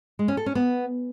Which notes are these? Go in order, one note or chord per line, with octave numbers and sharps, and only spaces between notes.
G#3
C#4
A4
C#4
B3